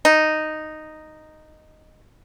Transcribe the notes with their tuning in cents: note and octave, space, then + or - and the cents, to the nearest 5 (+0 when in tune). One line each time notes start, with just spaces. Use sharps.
D#4 -5